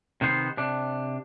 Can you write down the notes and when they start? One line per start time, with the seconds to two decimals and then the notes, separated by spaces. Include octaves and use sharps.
0.21 C3 D#3 B3 C5
0.57 C3 D4